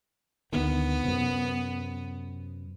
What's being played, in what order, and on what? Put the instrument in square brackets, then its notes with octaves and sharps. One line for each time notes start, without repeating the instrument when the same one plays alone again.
[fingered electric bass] D2 D3 D#3 [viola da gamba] B3
[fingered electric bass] F#2 C3